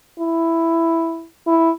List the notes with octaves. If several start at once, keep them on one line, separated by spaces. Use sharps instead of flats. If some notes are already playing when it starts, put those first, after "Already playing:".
E4
E4